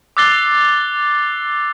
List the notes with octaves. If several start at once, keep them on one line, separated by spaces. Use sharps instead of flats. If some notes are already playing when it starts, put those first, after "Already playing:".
D6 E6 F#6 A6 C7 G7